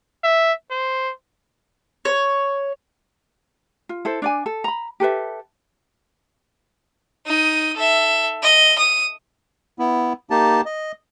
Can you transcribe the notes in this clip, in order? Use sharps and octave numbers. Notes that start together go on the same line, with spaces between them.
E5
C5
C#5
F4
E4 A4 C5
D4 D5 G#5
A4
A#5 B5
G4 A4 B4 E5
D#4 D#6
A4 E5
D#5
D#6
B3 E4
A#3 D#4 G4 A5
D#5